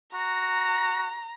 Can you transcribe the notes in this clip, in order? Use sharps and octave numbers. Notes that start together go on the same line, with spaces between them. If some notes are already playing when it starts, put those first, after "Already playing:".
F#4 A#5